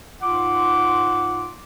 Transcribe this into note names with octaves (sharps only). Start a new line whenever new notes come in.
G#2 F4 F#5 C6 D6